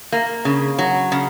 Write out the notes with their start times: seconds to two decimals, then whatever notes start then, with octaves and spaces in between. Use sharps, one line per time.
0.12 A#3
0.45 C#3
0.79 F#3
1.12 C#3